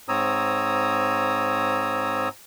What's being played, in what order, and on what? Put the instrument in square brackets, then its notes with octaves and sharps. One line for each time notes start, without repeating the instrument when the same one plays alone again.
[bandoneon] G#2 C4 C#5 A#5 D#6 E6